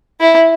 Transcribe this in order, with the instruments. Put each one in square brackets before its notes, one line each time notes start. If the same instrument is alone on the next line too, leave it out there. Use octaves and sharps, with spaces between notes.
[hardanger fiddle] E4